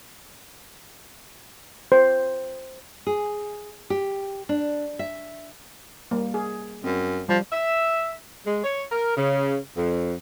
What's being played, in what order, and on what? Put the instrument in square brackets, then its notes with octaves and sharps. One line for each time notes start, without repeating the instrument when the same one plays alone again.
[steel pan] C5
[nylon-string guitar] G#4
G4
D4
E5
[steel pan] G3 A#3
G#4
[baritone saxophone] F#2 [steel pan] C4
[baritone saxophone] F3 [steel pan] G3
[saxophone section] E5
G#3
C#5
A#4
C#3
F2